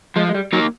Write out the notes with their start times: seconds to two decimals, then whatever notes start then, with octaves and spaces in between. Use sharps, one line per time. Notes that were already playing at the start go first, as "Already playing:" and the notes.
0.16 F3 G#3
0.29 G#3
0.34 G3
0.53 F#3 A#3 D#4